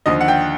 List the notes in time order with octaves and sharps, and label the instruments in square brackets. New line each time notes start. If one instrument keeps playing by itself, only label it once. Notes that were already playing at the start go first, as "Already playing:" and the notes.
[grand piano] D#2 D3 F3 D#5
F#5
G5